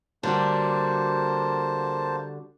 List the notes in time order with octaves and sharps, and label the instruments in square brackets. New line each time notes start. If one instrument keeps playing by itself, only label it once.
[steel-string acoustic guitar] D3 G3 F#4 [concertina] A#3 C5 A5